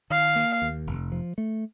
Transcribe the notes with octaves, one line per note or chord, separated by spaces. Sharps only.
D#3 F5
A#3
D#2
F1
F3
A3